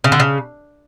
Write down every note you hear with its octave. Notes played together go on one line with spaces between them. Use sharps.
C#3
D3
C#3